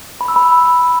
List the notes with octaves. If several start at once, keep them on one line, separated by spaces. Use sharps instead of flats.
B5
E6
B5